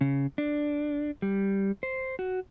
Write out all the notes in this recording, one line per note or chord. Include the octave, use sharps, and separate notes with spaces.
C#3
D4
G3
C5
F#4